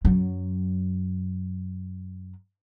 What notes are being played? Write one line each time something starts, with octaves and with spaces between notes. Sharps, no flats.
F#2 F#3